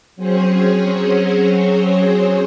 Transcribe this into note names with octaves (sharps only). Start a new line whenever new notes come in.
F#3 C4 C#4 G#4 C5 C#5